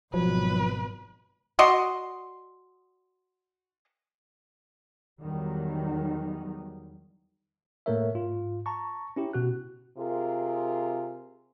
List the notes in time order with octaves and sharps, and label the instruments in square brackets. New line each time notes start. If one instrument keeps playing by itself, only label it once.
[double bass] G#1 B2 [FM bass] F3 [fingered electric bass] F#3 [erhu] B4
[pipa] F#4 D5 D#5 C6
[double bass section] E2 D#3 F#3 G3
[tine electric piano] A2 A3 A#3 A#4 C#5 E5
G#2 F4
A5 A#5 C#6
C#4 E4 G4
B2 F#4 F#6
[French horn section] C3 F4 G#4 A#4